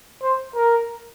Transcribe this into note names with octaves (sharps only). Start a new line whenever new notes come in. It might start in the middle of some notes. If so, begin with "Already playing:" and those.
C5
A#4